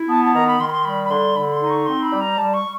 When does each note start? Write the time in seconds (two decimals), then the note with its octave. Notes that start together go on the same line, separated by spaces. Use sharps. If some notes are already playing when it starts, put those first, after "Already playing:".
Already playing: E4
0.09 B3 A5
0.25 A5
0.34 D#3 A#5
0.47 B5
0.60 D#3 C6
0.68 B5
0.72 C6
0.85 G3 B5
1.04 B5
1.10 D3 C6
1.36 D3 B5
1.53 C6
1.61 D#4
1.70 C#6
1.86 C4 C6
2.03 B5
2.12 G3
2.21 A#5
2.37 G3 A5
2.54 C#6
2.63 G3